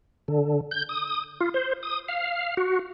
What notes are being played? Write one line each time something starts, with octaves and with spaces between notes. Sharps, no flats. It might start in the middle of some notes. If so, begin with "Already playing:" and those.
D3
G6
D#6
F4
C5
D#6
F5
F#4